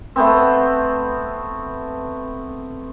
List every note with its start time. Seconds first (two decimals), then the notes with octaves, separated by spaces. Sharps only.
0.16 A3 B3 C4